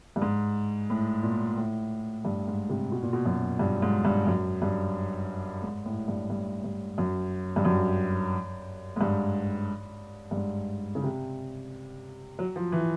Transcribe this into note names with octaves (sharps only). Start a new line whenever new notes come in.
G2
G#2
A2
A#2
A2
G2
G#2
C3
B2
A#2
B2
F#2
G2
G#2
G2
F#2
G2
G#2
A2
G2
G2
G2
F#2
G2
F#2
G#2
G2
G2
G#2
C#3
C3
F#3
F3
E3